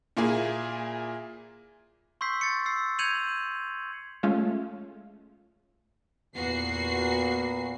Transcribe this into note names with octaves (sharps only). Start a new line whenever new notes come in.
A#2 A#3 E4 G#4
C6 C#6 E6 G6 B6 C7
A6 C#7
E6 C7
G6 G#6 C#7 D#7 F7 F#7
G#3 A3 C#4 F4 E5 F5
E2 A#2 B3 F#4 C7